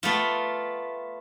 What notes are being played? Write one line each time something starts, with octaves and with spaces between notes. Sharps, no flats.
A3 B3 F4